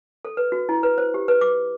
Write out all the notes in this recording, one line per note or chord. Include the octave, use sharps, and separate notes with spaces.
A4
B4
F#4
E4
B4
C5
G4
B4
D6